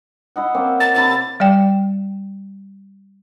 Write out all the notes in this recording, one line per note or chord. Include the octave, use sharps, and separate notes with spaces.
E4 D#5 F#5
A#3 C4 C#4
A#4 A6
C3 E4 A6
G3 D5 G5